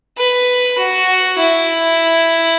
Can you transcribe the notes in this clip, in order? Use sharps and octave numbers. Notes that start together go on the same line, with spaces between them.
B4
F#4
E4